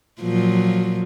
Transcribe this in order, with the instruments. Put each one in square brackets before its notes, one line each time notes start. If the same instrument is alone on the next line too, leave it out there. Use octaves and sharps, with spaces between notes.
[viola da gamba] A#2 F3 F#3